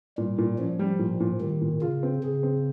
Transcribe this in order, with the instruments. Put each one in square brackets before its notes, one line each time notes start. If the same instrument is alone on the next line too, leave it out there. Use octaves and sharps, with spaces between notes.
[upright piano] A#2 [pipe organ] G3
[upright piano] A#2
[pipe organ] F3 [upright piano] C#4
[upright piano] G3
A#2
A#2
[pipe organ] D#3 [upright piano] G3
[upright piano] A#2
[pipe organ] C#3 [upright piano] F4
[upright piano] C4
[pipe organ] C#3 [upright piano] G#4
[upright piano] C4